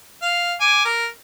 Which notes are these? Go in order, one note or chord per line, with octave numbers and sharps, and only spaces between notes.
F5
G#5 D6
A#4